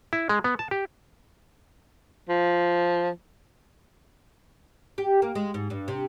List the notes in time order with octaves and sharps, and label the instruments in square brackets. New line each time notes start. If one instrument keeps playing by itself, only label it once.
[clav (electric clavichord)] E4
G#3
B3
A5
G4
[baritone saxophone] F3
[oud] G4
A#3
G#3
G#2
G2
C3